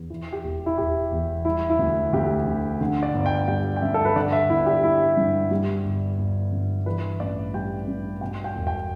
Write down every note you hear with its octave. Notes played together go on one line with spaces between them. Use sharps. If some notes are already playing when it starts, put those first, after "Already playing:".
Already playing: E2
E3
G4
E1
E4
E1 G4
E2
G3 E4
E4
D2
D2 G4
D3
D3
D5
G1
G5
G3 G5
G5
G2 E5
A4
B4
D3 D5
E5
G1 E4
G4
G3 E4
G2
G3
G1
G1
G2
E3 B4
A1 D5
G3 G5
G2
B2 G5
G5
E1
G5